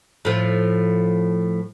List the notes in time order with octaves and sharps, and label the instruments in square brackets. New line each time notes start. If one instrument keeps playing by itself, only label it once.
[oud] A2 F3